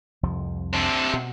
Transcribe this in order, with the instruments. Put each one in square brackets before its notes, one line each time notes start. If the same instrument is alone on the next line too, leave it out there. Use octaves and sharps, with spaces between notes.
[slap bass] C2 F2 F3
[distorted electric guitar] C3 D4
[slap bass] B2